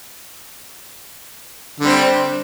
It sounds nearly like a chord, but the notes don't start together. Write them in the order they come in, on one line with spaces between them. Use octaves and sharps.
D3 G3 C4